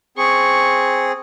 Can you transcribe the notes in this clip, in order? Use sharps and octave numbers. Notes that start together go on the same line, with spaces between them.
C4 G#4 C#6